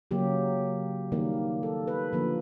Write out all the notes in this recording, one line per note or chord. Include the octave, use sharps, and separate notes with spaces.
C#3 F#3 A#3 G4
D#3 G3 A#3
A4
B4
D3 F3 A#3